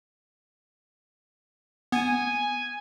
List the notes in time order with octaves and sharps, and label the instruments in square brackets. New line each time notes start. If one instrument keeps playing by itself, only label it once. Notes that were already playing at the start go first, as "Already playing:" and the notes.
[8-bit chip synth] B3 [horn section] G#5